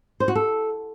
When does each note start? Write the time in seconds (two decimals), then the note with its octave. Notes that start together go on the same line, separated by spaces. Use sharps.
0.20 C5
0.28 F#4
0.35 A4